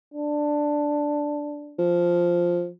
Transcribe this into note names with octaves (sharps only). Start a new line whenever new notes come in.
D4
F3